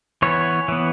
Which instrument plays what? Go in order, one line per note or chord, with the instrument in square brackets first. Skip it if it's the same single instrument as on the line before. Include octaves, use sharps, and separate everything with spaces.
[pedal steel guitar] E3 B3 C#5
E3 B3